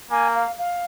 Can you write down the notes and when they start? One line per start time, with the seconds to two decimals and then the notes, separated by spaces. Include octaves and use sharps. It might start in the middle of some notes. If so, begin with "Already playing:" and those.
0.11 A#3 G#5
0.35 F5
0.59 F5